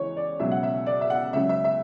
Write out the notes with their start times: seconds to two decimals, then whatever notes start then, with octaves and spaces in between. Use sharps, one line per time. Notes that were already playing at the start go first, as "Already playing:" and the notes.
Already playing: C#2 E3 C#5
0.17 D5
0.40 C#2 B2 F#3 E5
0.52 F#5
0.63 E5
0.86 D5
1.01 E5
1.10 F#5
1.33 C#2 C#3 F#3 E5
1.49 E5
1.64 E5